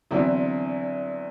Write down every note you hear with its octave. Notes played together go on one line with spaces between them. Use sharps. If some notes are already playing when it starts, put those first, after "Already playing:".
E2 D3 F#3 C4 E4